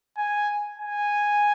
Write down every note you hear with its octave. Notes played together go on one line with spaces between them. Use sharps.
G#5
G#5